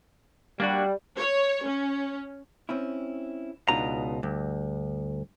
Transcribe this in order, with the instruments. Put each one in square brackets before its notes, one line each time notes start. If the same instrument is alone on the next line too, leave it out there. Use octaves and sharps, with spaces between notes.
[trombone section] G3 [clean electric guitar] A#3 D4 F#4
[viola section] C#5
C#4
[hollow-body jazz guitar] C4 C#4 E4
[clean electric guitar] C#2 B2 A#5 [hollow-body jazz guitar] D4 D#4 F4
[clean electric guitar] D2 [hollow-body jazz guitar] G2